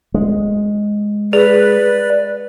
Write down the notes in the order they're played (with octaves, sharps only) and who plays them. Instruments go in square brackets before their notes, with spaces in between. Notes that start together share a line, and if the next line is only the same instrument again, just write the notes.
[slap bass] G#3
[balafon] G#4 [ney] B4 [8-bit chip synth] D5